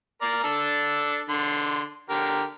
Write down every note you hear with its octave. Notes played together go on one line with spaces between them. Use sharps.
A#4 D5 A#5
D4 A4
D3 C6
D3 G4 A#4